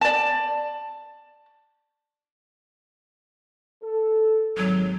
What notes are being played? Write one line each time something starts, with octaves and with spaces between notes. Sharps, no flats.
D5 A5
A4
G#1 F#3